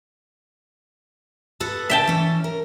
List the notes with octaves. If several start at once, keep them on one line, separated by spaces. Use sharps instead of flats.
B3 A4 F#5
C#3 A4 E5 G5 A5
E3 C#4
A#4